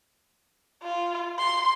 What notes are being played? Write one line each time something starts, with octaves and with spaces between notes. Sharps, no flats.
F4
C6